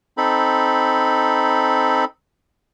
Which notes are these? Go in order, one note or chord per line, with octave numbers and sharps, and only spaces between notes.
C4 D#4 A4 B5